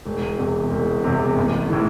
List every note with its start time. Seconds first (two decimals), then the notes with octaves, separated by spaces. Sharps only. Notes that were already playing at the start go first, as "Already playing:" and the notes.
0.06 E1
0.38 E2 C3
0.71 E1
1.04 E2 C3
1.36 A1
1.70 A2 E3